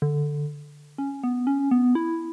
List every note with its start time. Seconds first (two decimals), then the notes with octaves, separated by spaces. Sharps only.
0.02 D3
0.98 C#4
1.23 B3
1.47 C#4
1.71 B3
1.95 E4